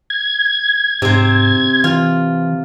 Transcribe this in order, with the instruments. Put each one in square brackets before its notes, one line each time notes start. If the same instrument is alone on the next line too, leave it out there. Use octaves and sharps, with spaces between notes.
[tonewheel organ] G#6
[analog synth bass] G#2 [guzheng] C3 C5
[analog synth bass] E3 [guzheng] F4